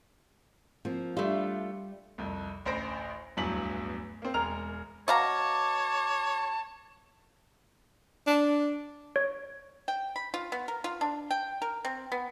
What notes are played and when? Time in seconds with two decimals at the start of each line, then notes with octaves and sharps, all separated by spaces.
0.85 F3 A#3 C4
1.17 G3 A3 D4 F4
2.18 C2 F2
2.66 A1 D2 C5 B5 A#6 D7
3.37 D1 E2 G2 F#3 B6 F#7
4.22 A#3 C4
4.34 E1 G#3 A#4 A#5 F6 F7
5.08 B2 C#5 F5 A5 A#5 D6
8.27 D4
9.16 C#5
9.88 G5
10.16 B5
10.34 F4
10.52 B3
10.68 A#4
10.84 F4
11.01 D4
11.30 G5
11.62 A#4
11.85 C4
12.12 B3